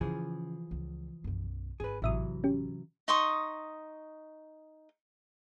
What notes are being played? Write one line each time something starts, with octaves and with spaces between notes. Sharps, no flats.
C#3 E3 F3 G#4
C#2
B1 F#2
G#1 D#4 G#4 B4
A1 C3 E3 F#3 E5 D#6
C#4 G4
D#4 C6 C#6 D#6